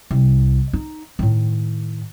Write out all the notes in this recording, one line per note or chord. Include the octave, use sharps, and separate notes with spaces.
C2
D#4
A2 D#3